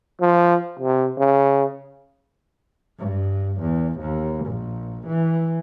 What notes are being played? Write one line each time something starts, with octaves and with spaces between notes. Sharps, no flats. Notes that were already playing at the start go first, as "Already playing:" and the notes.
F3
C3
C#3
G2
E2
D#2
A#1
E3